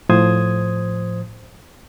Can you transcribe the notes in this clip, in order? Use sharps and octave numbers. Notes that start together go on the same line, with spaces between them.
A2 F3 C5 D#6 G#6